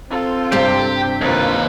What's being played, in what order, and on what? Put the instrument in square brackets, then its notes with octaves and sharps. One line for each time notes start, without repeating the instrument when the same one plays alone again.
[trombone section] C4 [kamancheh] F4 A4
[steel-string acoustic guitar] G2 C3 [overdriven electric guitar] G4
[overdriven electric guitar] D#2 B4 [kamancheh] A#3 F4